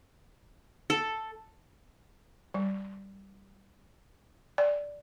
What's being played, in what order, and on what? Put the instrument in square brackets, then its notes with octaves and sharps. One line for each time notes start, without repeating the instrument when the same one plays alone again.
[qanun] A4
[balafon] G3
D5